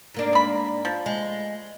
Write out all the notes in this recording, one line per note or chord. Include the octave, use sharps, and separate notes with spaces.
G#2 A#3 D4
D5 B5
F3
G#3